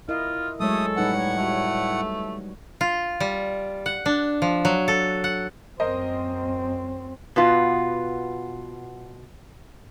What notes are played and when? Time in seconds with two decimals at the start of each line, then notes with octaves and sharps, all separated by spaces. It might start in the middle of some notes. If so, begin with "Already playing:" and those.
0.09 E4 F4 A#4 D#5
0.60 F#3 G#3 A3 A4 C#5 D#6
0.97 A2 G3 D#4 B4 F#5
1.14 C#5
1.37 G3 A3 F#4
2.81 F4
3.20 G3
3.86 F#5
4.06 D4
4.42 F3
4.65 F#3
4.88 A4
5.24 F#5
5.80 F#2 C4 A#4 C5 D#5
7.36 B2 B3 F4